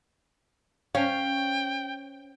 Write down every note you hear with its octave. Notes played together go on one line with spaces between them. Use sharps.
C#4 C5 C#5 F5 G5